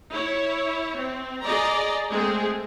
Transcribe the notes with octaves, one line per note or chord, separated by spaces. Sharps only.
E4 C#5
C4
G#4 D5 D#5 A#5
G#3 A3 C4 G#4